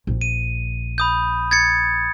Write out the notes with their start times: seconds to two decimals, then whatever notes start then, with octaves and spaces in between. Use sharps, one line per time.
0.07 A#1
0.21 D#7
0.98 B5 D#6 G6
1.51 G#6 A6 C#7